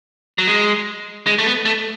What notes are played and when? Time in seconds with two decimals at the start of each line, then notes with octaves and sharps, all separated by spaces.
0.38 F#3
0.47 G#3
1.27 G#3
1.38 A3
1.46 B3
1.65 A3